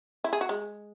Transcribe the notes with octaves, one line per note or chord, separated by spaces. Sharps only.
E4
G#4
F#4
G#3